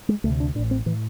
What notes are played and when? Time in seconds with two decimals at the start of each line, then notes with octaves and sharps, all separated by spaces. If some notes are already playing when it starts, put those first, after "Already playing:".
0.09 G#3
0.24 D2 A3
0.27 C3
0.40 D4
0.55 A2 D4
0.59 A1
0.71 C4
0.86 A2 E3